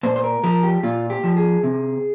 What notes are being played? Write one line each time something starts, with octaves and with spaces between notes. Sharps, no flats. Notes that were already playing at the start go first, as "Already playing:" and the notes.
A#2 C5
C5
A#4
F3 A#4
G4
A#2 F4
G4
F3
G#4
C3